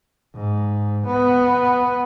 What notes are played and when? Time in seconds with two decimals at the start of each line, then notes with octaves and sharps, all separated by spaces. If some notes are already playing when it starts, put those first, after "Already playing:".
0.35 G#2
1.06 B3